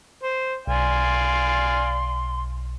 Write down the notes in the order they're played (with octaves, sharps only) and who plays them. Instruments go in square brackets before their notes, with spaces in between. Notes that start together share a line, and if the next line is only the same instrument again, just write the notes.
[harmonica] C5
[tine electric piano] B1 [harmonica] D5 F5 G#5 [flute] C6